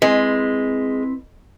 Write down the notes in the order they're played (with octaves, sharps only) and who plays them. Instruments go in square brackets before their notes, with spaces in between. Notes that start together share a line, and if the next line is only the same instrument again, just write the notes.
[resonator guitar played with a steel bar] G#3 [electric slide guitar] C4 E4 B4